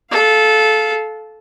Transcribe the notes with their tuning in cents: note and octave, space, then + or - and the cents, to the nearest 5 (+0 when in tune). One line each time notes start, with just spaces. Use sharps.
A4 -20 F5 +0